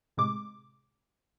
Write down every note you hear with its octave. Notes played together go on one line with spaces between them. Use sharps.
A2 C3 G#3 D6